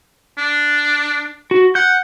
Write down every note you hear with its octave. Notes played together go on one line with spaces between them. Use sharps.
D4
F#4
F#5 G6